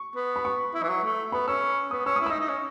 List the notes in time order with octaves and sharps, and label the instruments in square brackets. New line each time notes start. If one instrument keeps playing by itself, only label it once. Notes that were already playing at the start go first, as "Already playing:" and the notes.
Already playing: [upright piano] C#6
[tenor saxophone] B3
[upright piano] B5
C#6
[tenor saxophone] E4
E3
F#3
A3
[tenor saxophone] B3 [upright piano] B5
[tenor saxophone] C#4 [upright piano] E6
[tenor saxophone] B3 [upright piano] D#6
[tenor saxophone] C#4 [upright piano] E6
[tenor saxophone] E4 [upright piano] D#6
[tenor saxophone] D#4 [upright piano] E6
[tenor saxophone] D#4
C#4